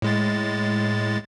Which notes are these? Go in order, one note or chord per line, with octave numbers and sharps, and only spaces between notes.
A2 G#3 A6